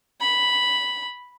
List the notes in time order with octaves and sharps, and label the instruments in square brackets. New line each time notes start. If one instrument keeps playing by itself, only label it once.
[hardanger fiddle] B5